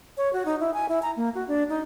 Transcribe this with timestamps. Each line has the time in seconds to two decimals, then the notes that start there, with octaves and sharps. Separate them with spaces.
0.17 C#5
0.33 F#4
0.45 D#4
0.60 E4
0.74 G#5
0.89 E4
1.03 A#5
1.16 A#3
1.35 F#4
1.48 D4
1.69 D#4